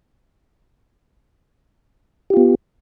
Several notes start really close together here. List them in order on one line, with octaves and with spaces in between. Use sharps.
G4 F4 B3